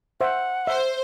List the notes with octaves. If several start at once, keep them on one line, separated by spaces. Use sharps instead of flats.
C5 E5 F#5
C5 E5